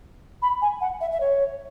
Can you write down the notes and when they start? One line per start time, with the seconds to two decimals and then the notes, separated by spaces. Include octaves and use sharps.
0.42 B5
0.62 G#5
0.81 F#5
1.01 E5
1.12 E5
1.20 C#5